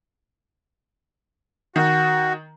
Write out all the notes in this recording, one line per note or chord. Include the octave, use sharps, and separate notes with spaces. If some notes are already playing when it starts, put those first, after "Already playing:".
D#3 F#4